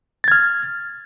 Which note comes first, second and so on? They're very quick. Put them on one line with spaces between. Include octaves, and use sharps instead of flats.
A6 G#6 F6